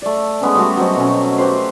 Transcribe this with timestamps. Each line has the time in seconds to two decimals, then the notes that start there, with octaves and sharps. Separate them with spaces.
0.02 A3 D5
0.41 G#3 B3 C#4
0.55 G3 A3 F#4
0.77 F#3 C4 D#5
0.96 B2 C#4
1.38 G4 B4 C5